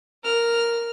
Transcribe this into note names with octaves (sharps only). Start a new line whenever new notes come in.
A#4 F6